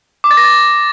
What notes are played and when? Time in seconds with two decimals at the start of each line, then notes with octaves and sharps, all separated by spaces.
0.24 D6
0.31 A6
0.37 A#6
0.44 A6